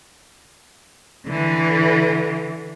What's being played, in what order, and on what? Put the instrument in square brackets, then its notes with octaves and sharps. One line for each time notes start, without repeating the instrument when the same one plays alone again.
[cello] D3 E3